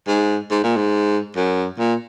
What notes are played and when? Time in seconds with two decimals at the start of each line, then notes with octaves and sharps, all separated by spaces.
0.08 G#2
0.51 G#2
0.64 A#2
0.77 G#2
1.37 F#2
1.79 A#2